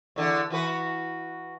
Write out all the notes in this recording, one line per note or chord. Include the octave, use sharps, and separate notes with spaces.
E2 D3
E3 F#4 B4